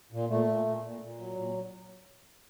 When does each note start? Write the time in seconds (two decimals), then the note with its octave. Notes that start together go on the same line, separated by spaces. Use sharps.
0.12 A#2
0.29 A#2 A3
0.48 A#2
0.65 A#2
0.83 A#2
1.01 A#2
1.18 F#3
1.36 A#2